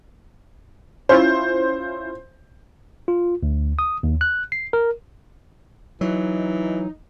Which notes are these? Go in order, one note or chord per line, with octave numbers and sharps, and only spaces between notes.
C#4 E4 F4 C5
F4
D2
D#6
D#2
F#6
C7
A#4
E3 F#3 D#4